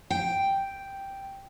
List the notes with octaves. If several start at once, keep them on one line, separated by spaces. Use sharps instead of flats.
G5